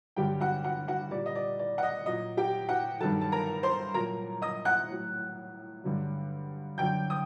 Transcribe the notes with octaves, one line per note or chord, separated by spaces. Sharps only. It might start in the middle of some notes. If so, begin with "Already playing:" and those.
G2 D3 F#3 G4 G5
F#4 F#5
F#4 F#5
F#4 F#5
A#2 G3 D5
D#5
D5
D5
F#5
D#5
A#2 F#3 D#5
G4 G5
F#4 F#5
G2 D#3 F#3 A4 A5
A5
A#4 A#5
C5 C6
A#2 F#3 A#4 A#5
D#5 D#6
F#5 F#6
A2 F#3
G2 D3 F#3
F#2 D3 F#3 G5 G6
D#6